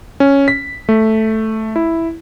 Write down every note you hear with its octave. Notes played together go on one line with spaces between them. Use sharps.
C#4
B6
A3
E4